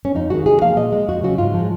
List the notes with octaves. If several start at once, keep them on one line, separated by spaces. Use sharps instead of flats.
C#4
F2 D#4
D#3 G#3 F#4
C3 G#4
F3 A#3 F5
A#2 D#5
G#3
F2 F#4
C#3 F#3 F#4
G#2 F4
F3 G#3